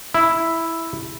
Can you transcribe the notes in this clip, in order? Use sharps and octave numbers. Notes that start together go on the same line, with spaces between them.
E4